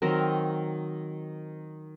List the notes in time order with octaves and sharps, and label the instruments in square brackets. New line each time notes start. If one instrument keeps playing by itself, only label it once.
[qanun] D#3 F#3 C4 A#4